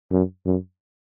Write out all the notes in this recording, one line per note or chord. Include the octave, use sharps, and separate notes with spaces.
F#2
F#2